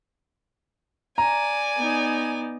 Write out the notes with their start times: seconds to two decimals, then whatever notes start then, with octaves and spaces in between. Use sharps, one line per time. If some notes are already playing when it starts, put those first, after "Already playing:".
1.18 D5 G#5 A#5
1.76 B3 D#4